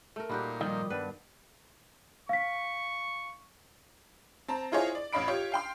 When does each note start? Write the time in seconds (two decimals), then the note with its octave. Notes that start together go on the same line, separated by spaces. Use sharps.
0.16 A3 A#4
0.29 A#2 G3 D#4 F#4 G4
0.61 D#3 F3 G3 D#5
0.90 G2 B3 D4 B4
2.29 F5 C#6 B6
4.48 C4 A5 A#5
4.72 E4 F4 G#4 C5 C#5 D#5
4.95 D5
5.13 A1 C#5 D#5 F5 B5 D7
5.28 F4 G4 C#5
5.52 F5 G5 C6